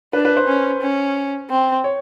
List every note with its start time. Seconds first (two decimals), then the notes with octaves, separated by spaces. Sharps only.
0.13 D4 B4
0.25 B4
0.37 C5
0.47 C#4
0.82 C#4
1.50 C4
1.84 C#5